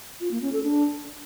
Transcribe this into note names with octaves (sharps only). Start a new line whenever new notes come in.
F4
A#3
C#4
A4
D4